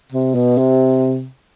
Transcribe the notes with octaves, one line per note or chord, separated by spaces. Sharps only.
C3
B2
C3